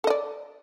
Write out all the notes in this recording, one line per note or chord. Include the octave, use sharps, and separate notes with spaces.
A4 D5 D#5